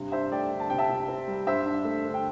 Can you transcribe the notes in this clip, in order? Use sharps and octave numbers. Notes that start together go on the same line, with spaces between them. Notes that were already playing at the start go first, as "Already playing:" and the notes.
Already playing: G2 C3
D4 C5 E5
A3 D5 G5
D3
A5
C3 G5
E5 A5
C3
C4
G3
G2 C5 E5
D4
A3
D3
G5